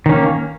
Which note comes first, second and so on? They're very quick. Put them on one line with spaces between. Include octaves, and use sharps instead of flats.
D#3 C#4 A#3